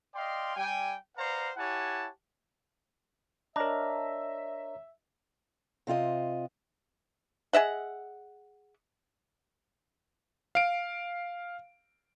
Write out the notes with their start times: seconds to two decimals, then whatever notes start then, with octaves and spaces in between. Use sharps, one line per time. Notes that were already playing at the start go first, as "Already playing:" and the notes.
0.15 D5 D#5 F5 G5 C6
0.56 G3 G5 G#5
1.17 B4 C5 D5 F5 F#5 A#5
1.56 E4 G4 C#5 F#5 G#5 A5
3.56 D4 A#4 C#5 D#5 E5 A#5
5.87 C3 C4 F4 D#5
7.53 G#4 D#5 E5 F#5
10.55 F5 D7